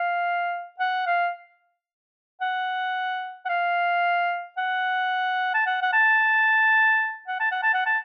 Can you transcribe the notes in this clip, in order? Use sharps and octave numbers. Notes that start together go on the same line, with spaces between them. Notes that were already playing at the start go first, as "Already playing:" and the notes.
Already playing: F5
F#5
F5
F#5
F#5
F5
F#5
A5
F#5
F#5
A5
F#5
A5
F#5
A5
F#5
A5